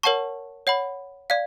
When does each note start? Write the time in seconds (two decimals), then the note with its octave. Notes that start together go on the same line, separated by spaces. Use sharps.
0.03 A#4 C#5 F#5 A5 C#6
0.67 C#5 F#5 B5
1.30 D5 F5